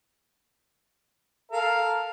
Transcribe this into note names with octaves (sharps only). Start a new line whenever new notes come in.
A4 A#4 F5